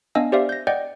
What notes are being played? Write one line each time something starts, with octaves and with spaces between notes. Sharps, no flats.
B3 D4 D#5 F5 G#5 E6
G4 C5 D5 E5 F5
G6 A#6
D5 D#5 F#5 G5 G6